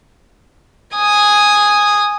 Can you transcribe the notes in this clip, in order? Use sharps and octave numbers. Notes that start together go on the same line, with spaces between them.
G#5 D#6